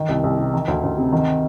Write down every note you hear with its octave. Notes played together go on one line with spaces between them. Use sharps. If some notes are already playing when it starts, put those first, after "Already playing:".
Already playing: D#3
C2
C2
C3
D#3
D2
D2
C3
D#3